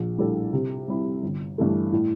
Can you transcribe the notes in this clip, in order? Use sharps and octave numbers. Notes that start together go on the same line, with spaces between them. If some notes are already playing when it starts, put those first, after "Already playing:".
Already playing: A#1
A2 G3 D4 A4
C3
G3 C4 E4
G1
G2 E3 A3
A2